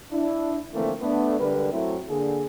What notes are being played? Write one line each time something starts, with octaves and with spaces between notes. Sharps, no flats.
D4 E4
D3 E3 F3 A3 A#3 C4
A3 B3 D4
D3 G3 G#3 A#4 B4
F#3 A3 C4 E4
D3 A#3 G#4